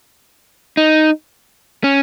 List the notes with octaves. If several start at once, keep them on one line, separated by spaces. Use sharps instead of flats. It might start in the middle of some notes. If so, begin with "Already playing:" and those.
D#4
C#4